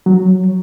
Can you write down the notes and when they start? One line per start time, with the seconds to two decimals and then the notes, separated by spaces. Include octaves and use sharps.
0.06 F#3